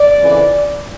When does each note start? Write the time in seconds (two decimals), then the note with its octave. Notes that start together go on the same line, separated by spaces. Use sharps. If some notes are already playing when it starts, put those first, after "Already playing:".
Already playing: D5
0.19 F2 C#3 E3